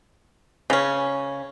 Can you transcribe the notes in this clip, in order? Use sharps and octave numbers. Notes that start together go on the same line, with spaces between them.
C#3 C#4